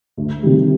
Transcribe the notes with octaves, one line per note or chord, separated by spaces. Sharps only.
D2
C3 D#3 G3